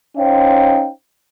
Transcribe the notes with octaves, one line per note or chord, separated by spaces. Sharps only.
C#4 D#4 C5 C#5 F5 G5